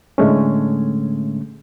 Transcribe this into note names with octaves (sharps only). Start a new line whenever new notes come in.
A2 D3 G#3 A3 C#4